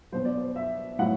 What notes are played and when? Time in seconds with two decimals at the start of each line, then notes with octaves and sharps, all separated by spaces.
0.12 B2 F#3 C5
0.25 D5
0.38 C5
0.56 E5
0.99 A2 F#3 F#5